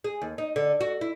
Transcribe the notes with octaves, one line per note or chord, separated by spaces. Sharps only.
G#4
D#2
D#4
D3
F#4
E4